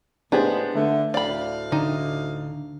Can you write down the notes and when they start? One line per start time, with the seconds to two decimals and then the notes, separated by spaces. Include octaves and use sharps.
0.32 A2 G#3 B3 D4 G4 G#4 C5
0.75 D3 A3
1.14 D2 A2 D5 F5 B5
1.72 D3 D#4